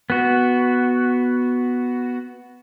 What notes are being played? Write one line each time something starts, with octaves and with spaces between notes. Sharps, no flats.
B3 F#4